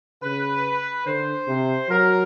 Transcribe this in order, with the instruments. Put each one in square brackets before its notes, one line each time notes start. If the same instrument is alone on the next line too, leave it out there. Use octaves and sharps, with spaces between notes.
[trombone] C#3 [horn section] B4
[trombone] D3 [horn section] C5
[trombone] C3
[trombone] F#3 [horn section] A#4